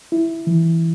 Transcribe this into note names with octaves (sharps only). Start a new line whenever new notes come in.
E4
E3